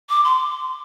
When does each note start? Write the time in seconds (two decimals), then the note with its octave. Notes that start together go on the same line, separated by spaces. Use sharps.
0.09 D6
0.24 C6